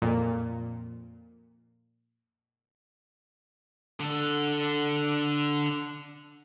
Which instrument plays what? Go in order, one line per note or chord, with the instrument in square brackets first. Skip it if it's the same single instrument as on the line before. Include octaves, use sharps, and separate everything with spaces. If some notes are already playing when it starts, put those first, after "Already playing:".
[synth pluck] F2 A#2
[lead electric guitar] D3 A4